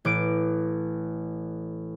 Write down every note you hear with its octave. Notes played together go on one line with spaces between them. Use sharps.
A1 D6 D7